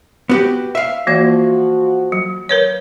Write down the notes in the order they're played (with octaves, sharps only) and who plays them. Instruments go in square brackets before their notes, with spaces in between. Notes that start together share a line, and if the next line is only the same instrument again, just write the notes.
[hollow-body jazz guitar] B3 F#4 G4
E5 F5
[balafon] E3 A#3 D5 [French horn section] F3 F#4
[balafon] F#3
A#4 B4 C#5